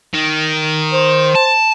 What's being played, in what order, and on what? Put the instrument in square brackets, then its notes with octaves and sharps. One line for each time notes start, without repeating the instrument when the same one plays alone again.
[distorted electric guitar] D#3
[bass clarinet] C5
[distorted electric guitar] A5